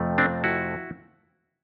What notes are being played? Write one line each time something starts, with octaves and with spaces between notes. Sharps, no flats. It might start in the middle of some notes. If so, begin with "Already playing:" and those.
Already playing: F2 C3 F3 A3
C4 D4
E4 F#4